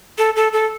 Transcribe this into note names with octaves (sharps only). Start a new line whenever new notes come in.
A4
A4
A4